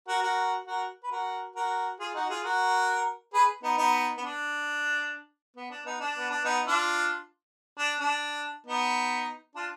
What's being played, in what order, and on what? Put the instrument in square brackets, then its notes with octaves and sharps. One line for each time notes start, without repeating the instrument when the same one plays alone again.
[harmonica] F#4 A#4
F#4 A#4
F#4 A#4
B4
F#4 A#4
F#4 A#4
F4 G#4
D#4 F#4
F4 G#4
F#4 A#4
G#4 B4
B3 D#4
B3 D#4
B3
D4
B3
D4
B3 D#4
D4
B3
D4
B3 D#4
D4 F4
D4
D4
B3 D#4
D4 F4